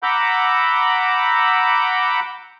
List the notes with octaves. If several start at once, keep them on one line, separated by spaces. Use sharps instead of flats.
F#5 A#5 B5 D6 E6 G6